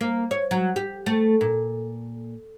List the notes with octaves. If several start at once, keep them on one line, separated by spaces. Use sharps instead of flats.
A#3
C#5
F#3
G4
A3
A#2